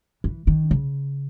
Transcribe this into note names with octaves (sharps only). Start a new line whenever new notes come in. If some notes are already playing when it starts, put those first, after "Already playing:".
E3
D#3
C#3